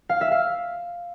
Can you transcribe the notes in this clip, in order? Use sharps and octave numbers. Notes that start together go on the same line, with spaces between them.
F5
E5
F5